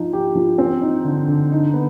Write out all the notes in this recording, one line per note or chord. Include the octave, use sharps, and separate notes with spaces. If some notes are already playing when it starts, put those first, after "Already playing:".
Already playing: F3 D#4
G4
F3
C4
D#4
D3
D3
D#4
B3